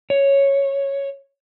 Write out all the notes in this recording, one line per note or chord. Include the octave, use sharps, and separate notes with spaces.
C#5